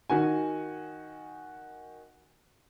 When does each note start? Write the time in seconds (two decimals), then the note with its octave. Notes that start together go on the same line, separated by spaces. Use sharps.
0.10 D#3 F#4 G#5